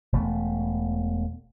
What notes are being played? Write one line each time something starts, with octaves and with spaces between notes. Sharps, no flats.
E1 B2 A3